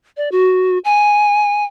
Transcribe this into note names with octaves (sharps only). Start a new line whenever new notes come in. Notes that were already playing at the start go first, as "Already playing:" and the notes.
D5
F#4
G#5